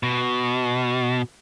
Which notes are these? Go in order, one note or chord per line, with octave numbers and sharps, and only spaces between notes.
B2